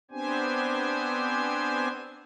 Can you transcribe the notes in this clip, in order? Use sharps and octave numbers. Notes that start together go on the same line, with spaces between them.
B3 C4 D4 G4 C5 G#5